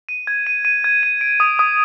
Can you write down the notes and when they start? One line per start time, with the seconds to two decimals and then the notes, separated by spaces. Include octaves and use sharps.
0.09 D#7
0.27 G#6
0.47 D#7
0.65 D#7
0.84 G#6
1.03 D#7
1.21 D7
1.40 D#6
1.59 D#6